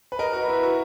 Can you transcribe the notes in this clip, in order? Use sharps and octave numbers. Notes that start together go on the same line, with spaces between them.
B4
A#4 D#5
F#4
B4
E4
F#4